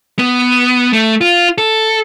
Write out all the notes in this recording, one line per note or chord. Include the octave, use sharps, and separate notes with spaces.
B3
A3
F4
A4